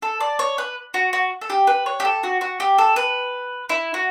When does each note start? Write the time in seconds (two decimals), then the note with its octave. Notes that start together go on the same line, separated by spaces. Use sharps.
0.02 A4
0.21 D5
0.39 C#5
0.58 B4
0.94 F#4
1.13 F#4
1.41 A4
1.50 G4
1.67 B4
1.86 C#5
2.00 G4
2.05 A4
2.23 F#4
2.41 F#4
2.60 G4
2.78 A4
2.96 B4
3.69 E4
3.94 F#4